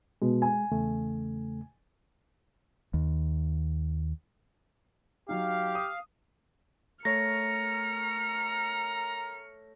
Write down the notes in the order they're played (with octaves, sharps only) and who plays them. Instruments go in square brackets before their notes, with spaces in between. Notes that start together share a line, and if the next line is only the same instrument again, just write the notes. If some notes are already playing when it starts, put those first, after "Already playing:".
[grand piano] B2 [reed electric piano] G#3
[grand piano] G#5
[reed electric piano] E2 C#3 A3
[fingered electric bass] D#2
[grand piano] F#3 D#4 [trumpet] G4 [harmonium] F5
[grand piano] D#6
[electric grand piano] A3 C#5 [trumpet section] A#4 A#5 [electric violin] F6 C#7 [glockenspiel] A#6